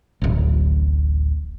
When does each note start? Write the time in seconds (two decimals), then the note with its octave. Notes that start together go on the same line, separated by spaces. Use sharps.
0.22 D1 A1